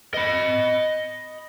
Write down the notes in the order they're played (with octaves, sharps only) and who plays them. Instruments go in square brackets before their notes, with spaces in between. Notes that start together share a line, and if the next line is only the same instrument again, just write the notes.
[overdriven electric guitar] D#5 B5